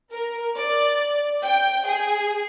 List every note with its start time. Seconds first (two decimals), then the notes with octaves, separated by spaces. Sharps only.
0.12 A#4
0.56 D5
1.44 G5
1.88 G#4